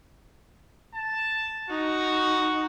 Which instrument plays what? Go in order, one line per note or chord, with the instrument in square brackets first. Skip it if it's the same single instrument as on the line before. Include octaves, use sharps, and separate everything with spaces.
[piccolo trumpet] A5
[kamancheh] D#4 [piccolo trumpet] F#4